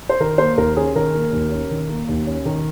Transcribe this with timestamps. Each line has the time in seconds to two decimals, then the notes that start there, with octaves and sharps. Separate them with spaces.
0.09 C5
0.20 D#3 A#4
0.38 A#3 C5
0.57 D#2 A#4
0.76 C#4 G#4
0.95 D#3 A#4
1.14 A#3
1.32 D#2
1.52 C#4
1.71 D#3
1.89 A#3
2.09 D#2
2.27 C#4
2.45 D#3 A#4